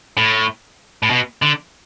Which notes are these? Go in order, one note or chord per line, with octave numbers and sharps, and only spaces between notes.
A2
A2
B2
D3